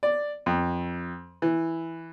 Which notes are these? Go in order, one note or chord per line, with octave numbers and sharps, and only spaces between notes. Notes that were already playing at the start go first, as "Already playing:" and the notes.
D5
F2
E3